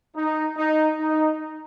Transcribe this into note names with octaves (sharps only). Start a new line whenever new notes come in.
D#4
D#4
D#4